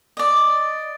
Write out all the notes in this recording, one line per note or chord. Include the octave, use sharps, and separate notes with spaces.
D5 D#5